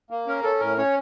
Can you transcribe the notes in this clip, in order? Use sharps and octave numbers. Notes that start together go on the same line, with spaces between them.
A#3
C#4 A#4
C#4 A4
A2 A#4
C#4 C#5